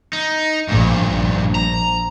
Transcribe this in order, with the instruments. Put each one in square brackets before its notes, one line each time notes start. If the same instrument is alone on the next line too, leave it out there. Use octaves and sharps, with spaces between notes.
[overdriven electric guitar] D#4
[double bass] A#1 [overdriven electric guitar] G2 A#2
[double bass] A#1
[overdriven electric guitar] A#5